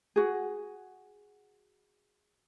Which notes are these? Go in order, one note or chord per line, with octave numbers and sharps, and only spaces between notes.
F#4 G#4